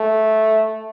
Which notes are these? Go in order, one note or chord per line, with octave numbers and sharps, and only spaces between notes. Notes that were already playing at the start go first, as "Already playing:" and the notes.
Already playing: A3